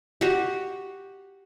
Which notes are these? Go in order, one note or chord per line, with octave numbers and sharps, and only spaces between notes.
F#4 G4